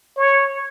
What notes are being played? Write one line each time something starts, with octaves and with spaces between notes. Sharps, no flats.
C#5